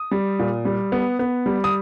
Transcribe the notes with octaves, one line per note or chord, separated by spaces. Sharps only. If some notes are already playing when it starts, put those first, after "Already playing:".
Already playing: D#6
G3
A#2
G3
B3
B3
G3
D#6